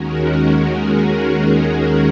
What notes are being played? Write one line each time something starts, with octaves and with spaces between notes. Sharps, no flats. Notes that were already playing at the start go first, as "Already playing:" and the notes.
Already playing: D#2 D#3 G#3 C#4 F#4 A#4
G#4
F#4 A#4